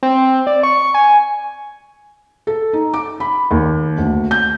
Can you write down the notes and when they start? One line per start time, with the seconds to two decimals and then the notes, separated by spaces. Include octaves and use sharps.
0.03 C4
0.47 D5
0.63 C#6
0.94 G#5
2.47 A4
2.73 D#4
2.94 D6
3.20 B5
3.51 D#2
3.98 D2
4.31 G6